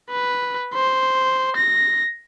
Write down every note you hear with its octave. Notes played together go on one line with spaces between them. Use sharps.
B4
C5
A#6